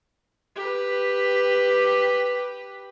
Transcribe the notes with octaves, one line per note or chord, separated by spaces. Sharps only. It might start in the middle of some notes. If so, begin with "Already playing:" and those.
G4 B4